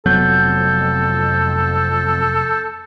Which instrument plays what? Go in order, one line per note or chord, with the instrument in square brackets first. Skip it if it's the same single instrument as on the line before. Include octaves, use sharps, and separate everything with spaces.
[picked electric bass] F1 F#3 B3 [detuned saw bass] F2 [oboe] A4 [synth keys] G6